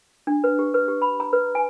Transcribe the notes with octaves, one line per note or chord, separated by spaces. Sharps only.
D4
B4
G4
B4
G4
B5
A#5
B4
G#5